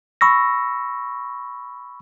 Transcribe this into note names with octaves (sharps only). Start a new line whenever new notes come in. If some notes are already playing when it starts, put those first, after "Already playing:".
B5 C#6 E6 A#6